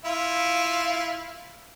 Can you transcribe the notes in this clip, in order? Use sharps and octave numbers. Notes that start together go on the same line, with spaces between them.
E4 F4